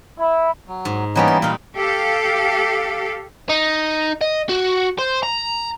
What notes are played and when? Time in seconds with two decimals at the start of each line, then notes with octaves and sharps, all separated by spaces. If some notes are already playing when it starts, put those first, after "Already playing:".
0.18 E4
0.68 F#3
0.85 G#2
1.16 E3 G3 A#3 B3 C#4 D#4
1.28 C6
1.42 A#2 D#4 F5
1.76 G4 A4 F5
3.49 D#4
4.21 D#5
4.49 F#4
4.98 C5
5.23 A#5